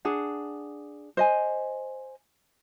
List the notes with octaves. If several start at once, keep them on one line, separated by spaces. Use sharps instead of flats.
D4 G#4 F#5
C5 D#5 G#5